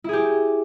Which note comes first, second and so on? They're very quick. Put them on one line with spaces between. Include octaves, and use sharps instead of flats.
E4 G#4 G4